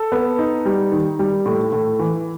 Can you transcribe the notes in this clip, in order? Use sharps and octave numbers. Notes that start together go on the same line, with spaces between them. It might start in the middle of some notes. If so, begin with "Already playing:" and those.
Already playing: A4
B3
D#4
G3
D#3
G3
A2
A2
E3